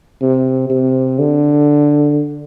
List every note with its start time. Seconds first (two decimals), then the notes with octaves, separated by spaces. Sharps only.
0.22 C3
0.70 C3
1.19 D3